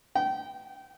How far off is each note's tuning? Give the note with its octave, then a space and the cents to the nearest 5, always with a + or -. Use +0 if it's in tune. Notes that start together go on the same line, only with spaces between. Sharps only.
G5 -25